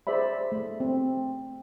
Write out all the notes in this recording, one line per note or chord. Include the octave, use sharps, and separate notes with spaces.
G#4 C5 D5 E5 B5
A3
C4